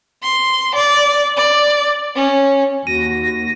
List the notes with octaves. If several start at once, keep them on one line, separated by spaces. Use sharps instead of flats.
C6
D5
D5
C#4
D#2 F#4 A#6 D#7